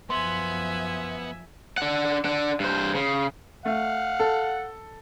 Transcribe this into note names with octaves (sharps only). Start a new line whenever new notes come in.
F#2 F3 B3 E5 G#5 C6
D4 F#5
D4 F#5
G2 C5
C#3
A3 F5 F#5
A4